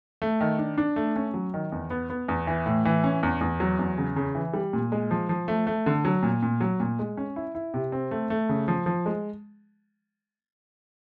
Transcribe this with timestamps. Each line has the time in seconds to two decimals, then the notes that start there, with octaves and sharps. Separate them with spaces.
0.22 A3
0.41 D#3
0.59 D4
0.78 D4
0.96 A3
1.16 C#4
1.34 F#3
1.54 D#3
1.72 E2
1.90 B3
2.10 B3
2.28 E2
2.47 E3
2.66 A2
2.85 E3
3.04 C#4
3.23 E2
3.41 E2
3.60 F#3
3.79 E2
3.98 C#3
4.16 C#3
4.35 E3
4.53 G3
4.73 A#2
4.92 G#3
5.11 F3
5.29 F3
5.48 A3
5.67 A3
5.86 D3
6.05 F#3
6.23 A#2
6.43 A#2
6.61 F#3
6.80 A#2
6.99 G#3
7.17 C#4
7.36 E4
7.55 E4
7.74 C3
7.92 C4
8.11 A3
8.30 A3
8.49 C#3
8.68 F3
8.86 F3
9.06 G#3